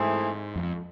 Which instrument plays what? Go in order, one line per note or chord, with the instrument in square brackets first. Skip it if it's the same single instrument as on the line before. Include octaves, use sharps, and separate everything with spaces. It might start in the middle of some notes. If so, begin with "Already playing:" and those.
Already playing: [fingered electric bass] G#2 [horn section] E3 A3 C4 G#4
[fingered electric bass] F2